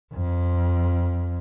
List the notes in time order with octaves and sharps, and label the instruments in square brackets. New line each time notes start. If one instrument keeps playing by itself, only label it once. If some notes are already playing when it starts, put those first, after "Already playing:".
[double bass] F2